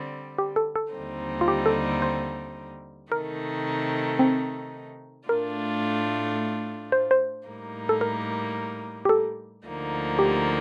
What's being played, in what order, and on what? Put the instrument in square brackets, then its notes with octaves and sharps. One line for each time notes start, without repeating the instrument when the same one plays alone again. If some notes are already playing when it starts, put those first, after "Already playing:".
Already playing: [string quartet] D3 G3 C4
[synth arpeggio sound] G4
A4
A4
[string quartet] D#2 D3 G3 C4 D#4
[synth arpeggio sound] F4
G4
A4
C5
[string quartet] C3 D#3 A3 D#4 [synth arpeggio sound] A#4
[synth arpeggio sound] C4
[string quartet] A2 A3 D4 F4 [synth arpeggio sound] A#4
[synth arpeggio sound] C5
C5
[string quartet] A2 G3 A#3 D#4
[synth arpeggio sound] A4
A#4
G4
A4
[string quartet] D2 D3 F3 A#3 D#4
[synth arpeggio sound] G4